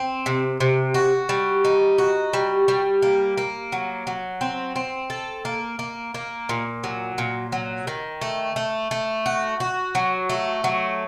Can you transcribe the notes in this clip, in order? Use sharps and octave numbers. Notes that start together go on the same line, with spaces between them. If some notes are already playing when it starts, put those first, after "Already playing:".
Already playing: C4
C3
C3
F#4
G3
D#4
F#4
G3
G3
A#3
A#3
F#3
F#3
C4
C4
A4
A#3
A#3
A#3
A#2
F#3
A#2
F#3
D#3
A3
A3
A3
F#4
F#4
F#3
A3
F#3